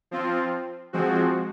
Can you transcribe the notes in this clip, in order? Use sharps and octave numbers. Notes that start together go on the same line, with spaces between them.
F3 C4 F4
F3 G#3 C4 F#4